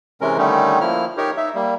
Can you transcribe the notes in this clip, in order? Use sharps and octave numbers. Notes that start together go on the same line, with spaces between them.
C3 E3 G#3 C#4 A#4
D3 D#3 G3 A3 C#4 D#4
F3 A#3 E4 F6
D#4 G4 A#4 C#5
D#4 E5
G3 A#3